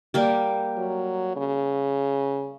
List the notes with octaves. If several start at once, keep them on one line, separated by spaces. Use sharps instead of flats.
G3 A#3 G4
F#3
C#3